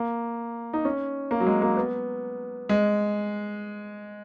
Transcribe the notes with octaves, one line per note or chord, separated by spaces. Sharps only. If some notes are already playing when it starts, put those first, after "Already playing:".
Already playing: A#3
D#4
C#4
A#3
F#3
G#3
A#3
B3
G#3